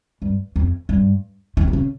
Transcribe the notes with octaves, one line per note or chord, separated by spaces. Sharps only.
G2
F2
G2
D#3
D#3
C#3